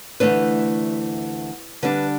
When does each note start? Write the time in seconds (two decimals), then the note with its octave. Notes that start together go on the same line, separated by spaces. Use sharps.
0.20 D2 C3 E3 A3 D4 B4
1.83 D3 G3 D4 B4